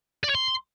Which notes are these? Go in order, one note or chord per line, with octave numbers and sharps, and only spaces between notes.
D5
C#5
C6